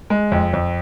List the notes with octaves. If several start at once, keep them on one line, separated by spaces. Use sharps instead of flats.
G#3
F2
F2